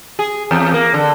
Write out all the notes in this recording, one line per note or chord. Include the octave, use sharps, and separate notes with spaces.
G#4
E2
A#3
D3